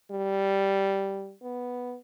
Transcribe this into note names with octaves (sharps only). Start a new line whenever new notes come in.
G3
B3